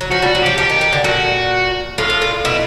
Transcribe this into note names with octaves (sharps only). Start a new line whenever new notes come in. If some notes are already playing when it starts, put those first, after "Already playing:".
F#3
F3 F#4
G3
F#4
F#3
F3 G4
F3 G4
D#3
D#3
D3
A#2 F#4
A2 F4
A2
A#2
B2 E4